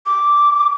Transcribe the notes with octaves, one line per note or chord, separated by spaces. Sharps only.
D6